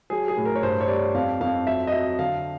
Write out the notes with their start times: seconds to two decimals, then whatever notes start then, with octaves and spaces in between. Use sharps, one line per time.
0.10 F#3 G#4
0.28 G#4
0.37 A2
0.45 A#4
0.56 C#5
0.63 G2 C5
0.81 C#5
0.88 G3 D5
1.14 F2 F5
1.41 F2 F5
1.66 F#3 E5
1.87 D#5
1.92 F#3 E5
2.19 D3 F5